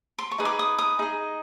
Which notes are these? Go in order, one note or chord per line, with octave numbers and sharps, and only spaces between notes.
C6
C#6
D#4 G#4 B4 D#5
D6
D#6
D#6
D#4 G#4 D#5